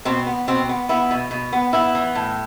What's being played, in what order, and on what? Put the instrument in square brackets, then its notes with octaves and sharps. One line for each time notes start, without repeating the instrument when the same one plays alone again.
[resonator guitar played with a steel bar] B2 C4
B3
B2 C4
B3
B3 E4
B2
B2
B3
B3 E4
E3
A2